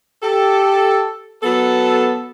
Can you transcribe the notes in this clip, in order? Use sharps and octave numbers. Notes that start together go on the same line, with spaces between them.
G4 A4
F#3 B3 A4